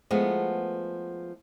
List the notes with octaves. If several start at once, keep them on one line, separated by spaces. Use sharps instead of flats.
F3 G#3 A3 B3